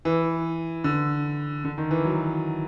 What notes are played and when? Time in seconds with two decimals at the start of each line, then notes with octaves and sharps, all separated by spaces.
0.05 E3
0.84 D3
1.65 D3
1.78 D#3
1.91 E3
2.05 F#3